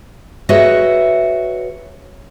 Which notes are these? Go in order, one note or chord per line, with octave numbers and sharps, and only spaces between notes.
F#4 G#4 B4 C#5 D#5 E5